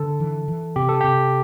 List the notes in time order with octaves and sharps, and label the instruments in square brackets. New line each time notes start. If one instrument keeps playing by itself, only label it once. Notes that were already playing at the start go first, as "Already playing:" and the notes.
Already playing: [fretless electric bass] D3 [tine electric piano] A4
[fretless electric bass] E3
E3
[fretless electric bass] C3 [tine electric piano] G4
[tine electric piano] A4
[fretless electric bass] C3 [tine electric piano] G4